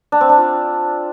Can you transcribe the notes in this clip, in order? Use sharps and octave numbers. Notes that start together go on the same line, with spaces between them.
D4
C4
D4
F4